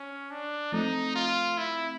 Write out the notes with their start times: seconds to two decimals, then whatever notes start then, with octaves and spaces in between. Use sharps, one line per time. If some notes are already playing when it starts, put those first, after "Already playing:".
Already playing: C#4
0.31 D4
0.72 F3 A3 C4 D#4
1.15 F4
1.58 E4